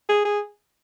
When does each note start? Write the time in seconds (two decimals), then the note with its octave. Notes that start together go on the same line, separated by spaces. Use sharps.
0.09 G#4
0.25 G#4